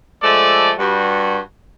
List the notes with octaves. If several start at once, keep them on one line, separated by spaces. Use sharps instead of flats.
F3 G#3 A3 A4 D5
G2 G3 F#4